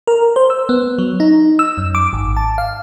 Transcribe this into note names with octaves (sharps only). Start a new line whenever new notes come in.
A#4
C5
E6
B3
F#3
D#4
E6
F#2
D6
G#1
A5
F5